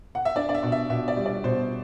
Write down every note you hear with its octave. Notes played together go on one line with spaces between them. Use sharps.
F#5
E5
D4 D5
D5
E5
B2
E5
B2 E5
D5
G3
D5
B2 C5